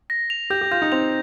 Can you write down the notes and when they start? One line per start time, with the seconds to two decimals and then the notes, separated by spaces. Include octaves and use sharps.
0.10 A#6
0.30 F7
0.50 G4 G6
0.61 G4
0.71 F4 G6
0.82 D#4
0.92 C4 F7